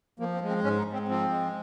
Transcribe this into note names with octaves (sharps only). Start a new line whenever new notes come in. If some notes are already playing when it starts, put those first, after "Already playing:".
F3 A#3
C4
G#3
C4
G#2 C#4
D#4
G#2
C4
F3 C4
G#3